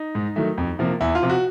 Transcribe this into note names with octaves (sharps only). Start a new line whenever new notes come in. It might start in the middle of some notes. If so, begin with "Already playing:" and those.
Already playing: D#4
G#2
D#3 F#3 A3
F2
C3 F3 A#3
E2 E4
F4
C3 F3
F#4